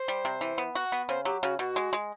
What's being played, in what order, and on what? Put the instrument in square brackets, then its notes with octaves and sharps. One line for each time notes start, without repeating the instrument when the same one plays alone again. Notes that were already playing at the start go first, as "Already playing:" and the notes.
Already playing: [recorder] C5
[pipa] G3
C3
E3
B3
F#4
B3
[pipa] C#3 [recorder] C5
[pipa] F#3 [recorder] G4
[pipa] C#3 [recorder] F#4
[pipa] B2 [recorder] F#4
[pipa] G#3
G#3